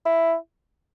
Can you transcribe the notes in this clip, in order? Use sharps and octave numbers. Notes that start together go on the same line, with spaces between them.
E4